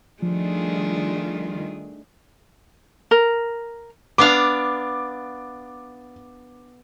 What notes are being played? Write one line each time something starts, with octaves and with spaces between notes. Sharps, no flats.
D#3 F3 G3 A3 D4 F4 G#4
A#4
B3 D4 F5 D6